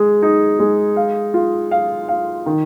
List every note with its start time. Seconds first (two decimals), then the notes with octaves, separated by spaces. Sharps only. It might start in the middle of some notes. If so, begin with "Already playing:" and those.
Already playing: G#3 G#4
0.22 D#4
0.59 G#3
0.96 F5
1.34 F4
1.71 F5
2.08 F5
2.46 D#3